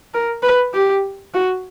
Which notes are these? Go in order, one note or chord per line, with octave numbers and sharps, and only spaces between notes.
A#4
B4
G4
F#4